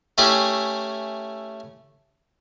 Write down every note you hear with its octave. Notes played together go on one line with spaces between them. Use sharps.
A3 C#4 E4 G4 G#4